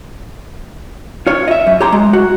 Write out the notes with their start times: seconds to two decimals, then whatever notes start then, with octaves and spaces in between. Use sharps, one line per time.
1.27 F4 C#5
1.48 D#5 E5
1.67 F#2
1.81 G4 C#5 A#5 C6
1.92 G#3
2.13 F#4